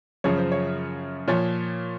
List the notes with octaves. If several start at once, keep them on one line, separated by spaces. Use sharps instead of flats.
F#2 C#3 F3 C#5
C5
C#5
A#2 F3 C#5